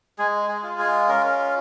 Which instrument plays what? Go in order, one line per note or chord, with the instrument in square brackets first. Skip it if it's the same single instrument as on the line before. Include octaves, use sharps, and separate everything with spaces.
[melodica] G#3 G#4
G#4
F4
G#4
C#4 A#4